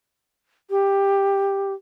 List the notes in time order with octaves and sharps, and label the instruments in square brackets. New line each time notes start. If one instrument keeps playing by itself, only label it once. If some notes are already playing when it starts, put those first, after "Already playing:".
[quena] G4